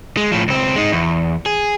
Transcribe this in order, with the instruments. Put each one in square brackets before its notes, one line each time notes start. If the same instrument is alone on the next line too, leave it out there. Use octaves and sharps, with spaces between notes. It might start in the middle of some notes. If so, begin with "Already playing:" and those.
[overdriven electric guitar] G#3
A2 F3
C#2 C4
G#3 D#4
E2
G#4